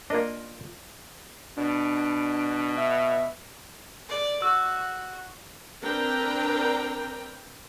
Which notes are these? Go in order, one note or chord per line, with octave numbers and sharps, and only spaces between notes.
A#3 D4 F4 A#4 D#5
B2 D4
E5
D5
F#4 E6
C4 D4 A#4 B4 G5 A#5